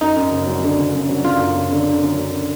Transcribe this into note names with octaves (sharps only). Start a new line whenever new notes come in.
F#2 D#4
F#2
F#1
F#3
D3
F#1
F#2
F#3
F#1 F4
F#2
F#1
D3
D3
F#2
F#2